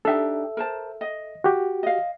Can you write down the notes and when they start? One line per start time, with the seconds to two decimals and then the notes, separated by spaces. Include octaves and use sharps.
0.05 D4 D#4 G4 A4 E5
0.57 A#4 C5 A5
1.01 D#5
1.44 F#4 G4
1.83 D#5 F5